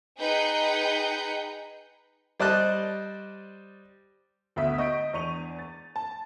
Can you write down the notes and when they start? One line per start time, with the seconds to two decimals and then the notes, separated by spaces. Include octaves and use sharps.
0.19 D#4 G#4 B4 G5 G6 C#7
2.40 G3 C5 D5 D#5 A5 F#6
4.56 D2 A3 B3 E5 D#6 B6
4.78 D#5 C#6 G6 D7
5.13 E2 D4 C#6 D#7 F7
5.59 A6
5.96 A5